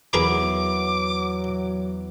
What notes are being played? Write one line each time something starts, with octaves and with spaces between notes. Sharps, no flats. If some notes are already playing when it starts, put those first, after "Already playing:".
E2 F#3 G#4 A#4 B4 D6